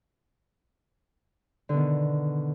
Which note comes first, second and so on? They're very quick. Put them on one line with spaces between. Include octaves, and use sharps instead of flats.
D3 B2 D#3